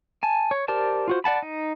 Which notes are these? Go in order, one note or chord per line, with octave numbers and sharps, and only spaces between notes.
G#5 A5
C#5
G4 A#4 C5 D5 A5
F4 F#4 C5
D5 F#5 A5 B5
D#4